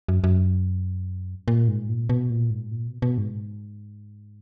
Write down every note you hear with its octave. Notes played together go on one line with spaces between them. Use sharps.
F#2
F#2
A#2
G#2
A#2
B2
A#2
G#2
A#2
B2
B2
G#2